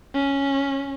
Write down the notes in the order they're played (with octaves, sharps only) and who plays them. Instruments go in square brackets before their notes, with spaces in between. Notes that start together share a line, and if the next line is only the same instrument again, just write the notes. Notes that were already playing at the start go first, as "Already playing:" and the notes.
[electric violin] C#4